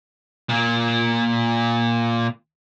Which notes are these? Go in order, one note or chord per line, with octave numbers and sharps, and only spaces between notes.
A#2 A#3